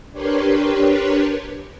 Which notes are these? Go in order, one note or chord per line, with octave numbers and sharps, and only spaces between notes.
D4 G4 A#4 B4 C#5 C6